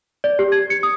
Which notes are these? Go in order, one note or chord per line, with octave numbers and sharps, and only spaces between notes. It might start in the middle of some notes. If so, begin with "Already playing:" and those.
D5
G4
G#6
C#7
D#6